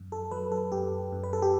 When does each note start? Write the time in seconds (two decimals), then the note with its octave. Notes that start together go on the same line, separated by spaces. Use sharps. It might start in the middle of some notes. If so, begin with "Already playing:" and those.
Already playing: F#2
0.12 A4
0.31 F#3 B4
0.52 A4
0.72 F#2 G4
1.12 F#2
1.24 B4
1.33 A4
1.42 G4